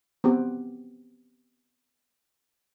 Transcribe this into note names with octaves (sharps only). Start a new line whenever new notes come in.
B3 C4 G4